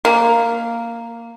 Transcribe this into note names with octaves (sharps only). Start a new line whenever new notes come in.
A#3